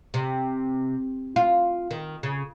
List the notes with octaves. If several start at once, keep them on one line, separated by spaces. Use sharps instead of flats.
C3
F4
D#3
C#3